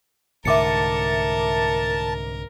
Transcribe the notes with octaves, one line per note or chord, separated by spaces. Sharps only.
C2 G#2 D3 A#4 E5 A5 D6 C#7